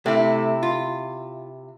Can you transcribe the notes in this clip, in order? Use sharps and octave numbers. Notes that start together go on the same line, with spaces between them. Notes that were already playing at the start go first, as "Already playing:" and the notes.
C3 A3 E4
F4